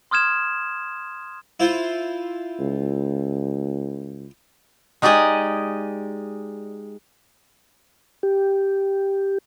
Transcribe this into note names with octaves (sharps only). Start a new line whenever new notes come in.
C6 D#6 F6 G#6 E7
E4 F4 C5
C#2
G#3 D#4 G4 D5 D#5 G#5
G4